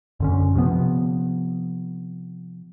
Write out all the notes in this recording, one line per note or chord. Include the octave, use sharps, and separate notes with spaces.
F#2 D3 C#4
C3 F3 B3